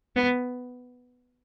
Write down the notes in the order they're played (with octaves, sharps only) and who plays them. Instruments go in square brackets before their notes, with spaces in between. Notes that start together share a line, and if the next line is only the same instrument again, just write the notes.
[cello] B3